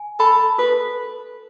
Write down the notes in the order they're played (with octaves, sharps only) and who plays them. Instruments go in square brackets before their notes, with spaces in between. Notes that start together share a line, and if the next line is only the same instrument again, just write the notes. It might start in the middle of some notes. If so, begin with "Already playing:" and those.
Already playing: [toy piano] G#5
[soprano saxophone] A4 [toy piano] B5
[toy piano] A4 [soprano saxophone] B4